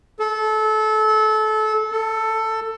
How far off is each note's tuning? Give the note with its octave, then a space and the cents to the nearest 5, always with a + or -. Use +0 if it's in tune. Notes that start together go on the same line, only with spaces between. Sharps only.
A4 -25
A4 +10